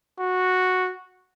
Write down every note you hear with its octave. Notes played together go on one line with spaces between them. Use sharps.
F#4